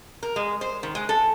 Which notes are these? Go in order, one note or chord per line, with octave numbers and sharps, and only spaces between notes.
A#4
G#3
C5
D#3
G#3
A4